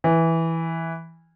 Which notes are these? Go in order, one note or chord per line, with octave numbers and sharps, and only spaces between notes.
E3